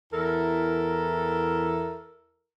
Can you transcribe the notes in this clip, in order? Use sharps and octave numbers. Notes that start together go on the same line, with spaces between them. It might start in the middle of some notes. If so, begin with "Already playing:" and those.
E2 E4 A4 A#4